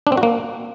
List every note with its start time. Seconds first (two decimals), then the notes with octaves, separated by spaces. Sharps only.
0.07 D4
0.12 C4
0.17 F#4
0.23 A#3